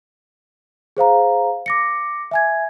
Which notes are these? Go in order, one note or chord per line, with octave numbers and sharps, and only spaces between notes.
G#4 C5 F5 A#5
D6 A#6 C#7
E5 G#5 G#6